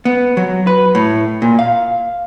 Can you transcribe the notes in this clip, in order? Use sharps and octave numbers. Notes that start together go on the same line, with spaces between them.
B3
F#3
B4
A2
A#2
F5